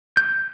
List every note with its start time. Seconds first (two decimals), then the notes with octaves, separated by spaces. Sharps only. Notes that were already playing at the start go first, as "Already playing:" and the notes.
0.17 G6